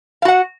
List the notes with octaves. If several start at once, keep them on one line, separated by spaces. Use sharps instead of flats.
F#4 F5 F#5